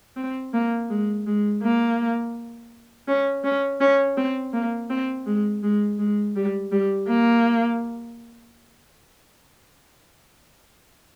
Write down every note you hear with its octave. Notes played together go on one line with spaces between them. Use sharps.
C4
A#3
G#3
G#3
A#3
C#4
C#4
C#4
C4
A#3
C4
G#3
G#3
G#3
G3
G3
A#3